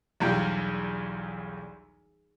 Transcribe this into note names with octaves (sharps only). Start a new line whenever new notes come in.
B1 E2 G3 F4 G5